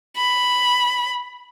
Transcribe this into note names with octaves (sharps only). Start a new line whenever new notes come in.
B5